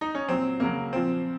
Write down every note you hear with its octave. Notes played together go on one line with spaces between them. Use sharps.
D#4
C#4
A#2 F#3 C4
C#3 F#3 A#3
A#2 F3 C4